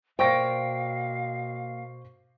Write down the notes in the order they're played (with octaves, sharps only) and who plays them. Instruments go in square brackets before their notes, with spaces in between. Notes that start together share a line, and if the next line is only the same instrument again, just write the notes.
[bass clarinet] B2 [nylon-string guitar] A#3 D5 G5 [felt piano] C5 C#6 A#6 [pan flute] F5